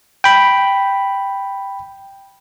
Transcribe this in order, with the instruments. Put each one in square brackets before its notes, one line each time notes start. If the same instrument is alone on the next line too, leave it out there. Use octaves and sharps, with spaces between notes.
[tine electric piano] G5 B5